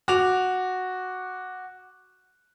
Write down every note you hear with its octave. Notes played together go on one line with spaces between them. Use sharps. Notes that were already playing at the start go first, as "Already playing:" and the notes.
F#4 D6 F7